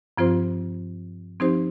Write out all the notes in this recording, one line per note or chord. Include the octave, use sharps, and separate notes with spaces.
G2 F3 C4 F4 C5
F3 C4 D#4 G4 C5